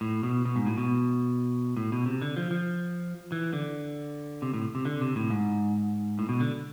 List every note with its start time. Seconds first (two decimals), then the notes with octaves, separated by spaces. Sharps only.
0.01 A2
0.23 B2
0.45 B2
0.56 G#2
0.66 A2
0.78 B2
1.77 A2
1.92 B2
2.06 C3
2.22 D3
2.37 F3
2.51 F3
3.32 E3
3.53 D3
4.42 C3
4.54 A2
4.75 C3
4.85 D3
5.01 C3
5.16 A2
5.30 G#2
6.19 A2
6.29 B2
6.40 D3